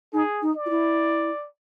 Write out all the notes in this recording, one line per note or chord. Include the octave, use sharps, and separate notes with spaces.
D#4 G#4
D#4
D5
F4
E4